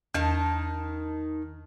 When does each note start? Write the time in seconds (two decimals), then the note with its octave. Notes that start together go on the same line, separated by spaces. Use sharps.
0.14 E2 D#3 D#4 A5